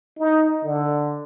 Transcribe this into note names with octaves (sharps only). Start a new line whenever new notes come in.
D#4
D3